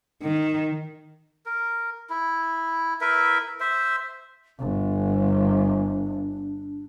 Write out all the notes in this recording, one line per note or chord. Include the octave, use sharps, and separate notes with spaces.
D#3
A#4
E4
E4 A#4 B4 E5
C5 E5
G1 D4